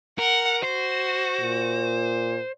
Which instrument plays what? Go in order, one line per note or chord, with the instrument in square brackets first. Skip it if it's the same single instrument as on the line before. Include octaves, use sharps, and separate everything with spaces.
[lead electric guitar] A#4 [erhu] F#5
[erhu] F#4 [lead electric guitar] C5
[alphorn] A#2